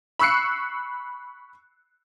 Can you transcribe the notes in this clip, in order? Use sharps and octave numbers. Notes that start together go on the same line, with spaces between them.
B5 C#6 E6 F#6 C7 C#7